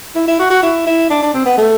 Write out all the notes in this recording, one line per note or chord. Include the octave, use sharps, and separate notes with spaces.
E4
E4
F#4
F#4
E4
E4
D4
D4
C4
B3
A3